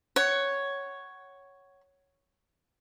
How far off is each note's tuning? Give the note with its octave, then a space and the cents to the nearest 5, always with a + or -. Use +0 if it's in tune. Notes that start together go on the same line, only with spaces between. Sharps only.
C#5 +0 F#5 +20